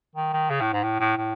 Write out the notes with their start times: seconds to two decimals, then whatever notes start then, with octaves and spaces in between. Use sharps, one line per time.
0.16 D#3
0.33 D#3
0.50 C#3
0.61 A2
0.73 G#2
0.83 A2
1.00 A2
1.17 A2